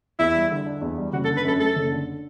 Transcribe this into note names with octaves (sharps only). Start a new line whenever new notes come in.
E2 E4
G3
D3
D4
E2
G3
F#1 F#4
A4
D3
B4
F#2 A4
A3 A4
F#1
D3